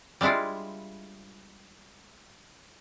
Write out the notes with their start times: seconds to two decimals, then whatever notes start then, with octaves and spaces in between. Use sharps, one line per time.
0.21 G3 G#3 D4 E4 F4